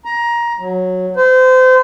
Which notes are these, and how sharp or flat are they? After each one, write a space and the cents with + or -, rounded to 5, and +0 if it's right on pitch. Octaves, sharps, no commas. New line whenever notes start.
A#5 +20
F#3 -10
C5 -30